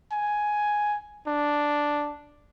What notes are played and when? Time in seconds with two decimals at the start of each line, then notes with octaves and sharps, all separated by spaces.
0.12 G#5
1.27 D4